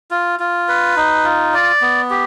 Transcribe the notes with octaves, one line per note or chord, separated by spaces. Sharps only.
F4
F4
B4
D#4
F4
D5
B3
G4